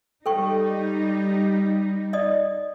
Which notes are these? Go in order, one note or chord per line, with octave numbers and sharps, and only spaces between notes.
G3 D#4 A4 G5 C#6
D5 D#5 D#6